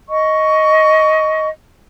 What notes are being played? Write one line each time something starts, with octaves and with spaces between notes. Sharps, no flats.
D#5 C#6